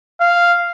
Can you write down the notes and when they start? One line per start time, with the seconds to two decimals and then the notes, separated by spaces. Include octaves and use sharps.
0.20 F5